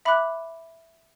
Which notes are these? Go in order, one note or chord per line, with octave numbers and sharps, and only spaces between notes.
E5 B5 D6 F#6